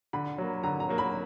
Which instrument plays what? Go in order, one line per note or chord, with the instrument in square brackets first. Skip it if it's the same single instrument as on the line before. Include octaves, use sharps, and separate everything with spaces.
[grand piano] D3 [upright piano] B5
[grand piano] F#3 A#3
[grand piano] D3 [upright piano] A#5
[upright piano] A#5
[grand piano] F#3 A#3
[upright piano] B5